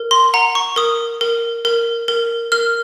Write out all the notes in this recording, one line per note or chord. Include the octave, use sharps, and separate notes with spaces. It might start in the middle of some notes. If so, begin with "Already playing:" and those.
Already playing: A#4
C6
F#5 A#5
C#6
A#4 D#6
A#4
A#4
A#4
A#4 F6